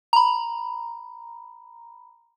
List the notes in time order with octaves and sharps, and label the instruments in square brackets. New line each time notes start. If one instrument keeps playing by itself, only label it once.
[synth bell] A#5 B5